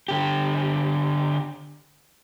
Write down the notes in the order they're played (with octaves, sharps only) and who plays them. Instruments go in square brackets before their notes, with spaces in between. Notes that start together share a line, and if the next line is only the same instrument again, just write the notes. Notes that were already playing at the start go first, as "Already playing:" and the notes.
[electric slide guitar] D3 G4